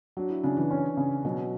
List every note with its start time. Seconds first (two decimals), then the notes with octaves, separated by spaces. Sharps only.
0.17 F#3 D4
0.30 E4
0.43 C#3 D4
0.57 E3
0.71 C#4
0.97 C#3
1.25 B2 F#3